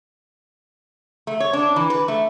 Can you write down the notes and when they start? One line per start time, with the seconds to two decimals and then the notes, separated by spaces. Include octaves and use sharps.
1.27 A3
1.40 C#5
1.53 D4
1.76 E3
1.90 B4
2.08 A3